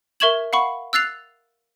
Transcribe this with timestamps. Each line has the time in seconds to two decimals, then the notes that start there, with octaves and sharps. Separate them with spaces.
0.20 A#4 E5 C#6 G#6 E7 F#7
0.53 F5 F#5 B5 C#6
0.93 E6 F#6 A6 C7 F7